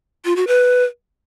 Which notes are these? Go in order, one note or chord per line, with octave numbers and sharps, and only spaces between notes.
F4
F#4
B4